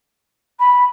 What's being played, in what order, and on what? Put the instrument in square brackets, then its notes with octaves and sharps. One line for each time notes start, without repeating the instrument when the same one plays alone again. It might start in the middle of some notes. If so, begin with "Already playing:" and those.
[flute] B5